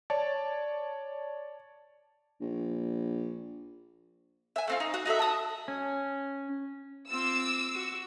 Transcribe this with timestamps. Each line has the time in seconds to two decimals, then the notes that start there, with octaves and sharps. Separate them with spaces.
0.10 C#5 D5 A5
2.41 A#1
4.56 E5 G#5
4.68 A3 C4 F4
4.80 D#4
4.94 F#4
5.06 D#4 F#4 A4 E5
5.19 A5 D#6
5.68 C#4
7.11 C4 F4 D6 E6
7.75 F#4